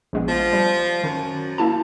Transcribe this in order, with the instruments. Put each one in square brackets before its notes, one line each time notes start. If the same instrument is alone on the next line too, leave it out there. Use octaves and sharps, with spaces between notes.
[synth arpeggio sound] A#1 G#3 B3
[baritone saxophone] F3
[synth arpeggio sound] G3
[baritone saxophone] F#2 [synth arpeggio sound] D#3
[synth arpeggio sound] A#3 E4 A5